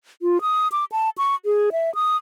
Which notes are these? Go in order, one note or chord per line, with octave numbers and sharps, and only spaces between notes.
F4
D#6
D6
A5
C#6
G#4
E5
D#6